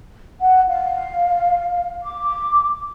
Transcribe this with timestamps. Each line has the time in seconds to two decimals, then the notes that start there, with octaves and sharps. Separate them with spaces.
0.40 F#5
0.68 F5
2.02 D6